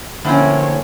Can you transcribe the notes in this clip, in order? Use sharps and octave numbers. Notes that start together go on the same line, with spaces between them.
A2 D3 F3 A#3 C4 C#4 C#5